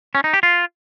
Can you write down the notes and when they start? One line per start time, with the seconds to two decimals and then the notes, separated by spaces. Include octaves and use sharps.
0.15 C#4
0.24 D#4
0.33 G4
0.43 F4